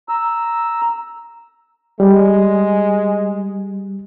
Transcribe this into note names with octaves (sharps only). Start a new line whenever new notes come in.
A#5 E6
G3 G#3